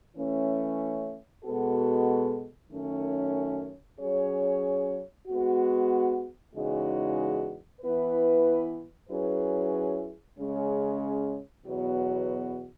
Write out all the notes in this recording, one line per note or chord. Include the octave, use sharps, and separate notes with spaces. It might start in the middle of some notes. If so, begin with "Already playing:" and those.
E3 A3 C#4
B2 G#3 B3 F#4 A4
F#2 D#3 A3 C#4
F#3 C#4 G#4 C#5
G#3 B3 F#4
E2 C#3 G#3 D#4 F#4
E3 B3 E4 B4
F#3 C#4 E4 G#4 B4
C#3 G#3 C#4
E2 B2 F#3 B3 F#4